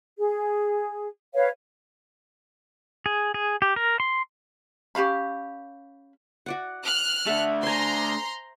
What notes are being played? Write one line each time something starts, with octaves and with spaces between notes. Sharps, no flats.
G#4
B4 C#5 F5
G#4
G#4
G4
A#4
C6
C#4 G4 F5 B5
F#4 D5 F#5
F6 F#6
A3 D4 A4 E5 F#5
C5 G#5 A#5 C6